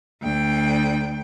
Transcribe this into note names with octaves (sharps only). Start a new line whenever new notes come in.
D2 G5